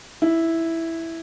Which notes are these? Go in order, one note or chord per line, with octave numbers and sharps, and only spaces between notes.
E4